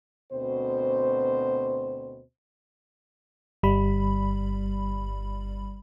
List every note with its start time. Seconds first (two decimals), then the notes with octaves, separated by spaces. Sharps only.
0.33 D2 B2 C4 C5
3.63 G1 G3 B5